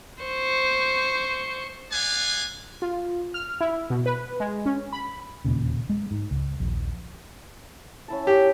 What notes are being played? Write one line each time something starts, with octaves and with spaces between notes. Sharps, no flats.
C5 C#6
B3 D5 F5 F#5 G#5
F4
F6
E4
B2
B4
G#3
C#4
B5
E1 D#2 A#2 C#3
G#3
G#2
C#2
D#1 A#1
C#4 E4 A5
G4